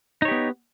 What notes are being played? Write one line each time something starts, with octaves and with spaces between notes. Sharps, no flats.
B3 D#4 G4 C#5